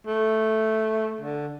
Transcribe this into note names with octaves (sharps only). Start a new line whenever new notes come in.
A3
D3